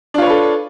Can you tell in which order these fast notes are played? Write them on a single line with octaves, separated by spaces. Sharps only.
D4 F4 C#5 B4 A4